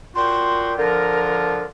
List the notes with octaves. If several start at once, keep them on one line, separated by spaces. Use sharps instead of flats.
A#2 F4 F#4 G5 C6
D3 F3 F4 A#4